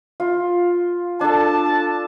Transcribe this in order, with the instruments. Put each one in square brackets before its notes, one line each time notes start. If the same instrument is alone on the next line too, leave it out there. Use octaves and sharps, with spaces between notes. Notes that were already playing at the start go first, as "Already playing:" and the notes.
[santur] F4
[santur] D4 A4 [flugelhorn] A5